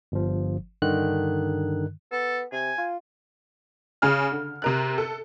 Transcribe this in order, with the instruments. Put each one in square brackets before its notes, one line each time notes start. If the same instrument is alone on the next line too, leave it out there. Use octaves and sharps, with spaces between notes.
[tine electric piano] G1 F3
G2 D3 D#3 F#6
[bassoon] B3 [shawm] A4
[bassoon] C3 [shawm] G#5
[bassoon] F4
[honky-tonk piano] C#3 G#4 F6
D3
C3 A#4 F#6
A4